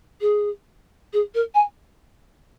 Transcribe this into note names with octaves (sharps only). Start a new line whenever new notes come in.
G#4
G#4
A#4
G#5